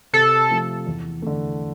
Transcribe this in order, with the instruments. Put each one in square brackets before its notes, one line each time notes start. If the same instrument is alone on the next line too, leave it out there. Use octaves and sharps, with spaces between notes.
[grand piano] C3 [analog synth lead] A4
[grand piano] F3 A3
E2
D3 A3